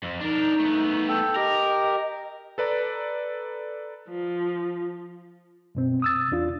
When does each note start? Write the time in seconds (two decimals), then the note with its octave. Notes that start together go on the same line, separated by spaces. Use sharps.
0.03 F2
0.20 D4 D#4 A#4
0.59 A3 B3
1.08 A4 G5
1.36 G4 A#4 D#5
2.58 A4 B4 D5 A#5
4.09 F3
5.75 F#2 B2 C4
6.02 D#6 E6 A6
6.31 E2 D4 F4